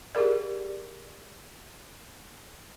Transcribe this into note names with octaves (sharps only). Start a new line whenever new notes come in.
G4 G#4 A#4 D5